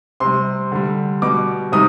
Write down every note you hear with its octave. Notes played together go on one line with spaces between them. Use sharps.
C3 G3 C6
D3 G3
B2 G3 D6
C3 D#3 G3 D#6